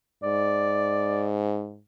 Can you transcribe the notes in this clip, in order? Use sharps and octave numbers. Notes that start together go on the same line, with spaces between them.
G#2 D5